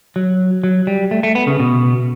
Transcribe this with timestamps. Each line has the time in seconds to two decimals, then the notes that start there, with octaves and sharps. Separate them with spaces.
0.16 F#3
0.64 F#3
0.87 G3
1.11 A3
1.23 A3
1.35 B3
1.47 C#3
1.60 B2